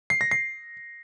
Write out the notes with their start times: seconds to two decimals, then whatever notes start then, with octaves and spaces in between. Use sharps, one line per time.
0.10 C7
0.21 A#6
0.31 C7